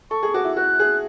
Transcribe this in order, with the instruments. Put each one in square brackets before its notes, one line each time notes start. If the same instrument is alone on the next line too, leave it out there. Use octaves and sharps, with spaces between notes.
[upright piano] A4 [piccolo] C#6
[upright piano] G#4
[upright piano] F#4 [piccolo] D6
[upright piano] E4
[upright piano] F#4 [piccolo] F#6
[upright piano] G#4